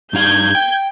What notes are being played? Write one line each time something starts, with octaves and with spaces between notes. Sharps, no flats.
G2 D#4 F5 G6 G#6
G5